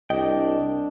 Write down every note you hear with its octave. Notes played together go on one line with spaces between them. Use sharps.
C2 D4 D#5 G5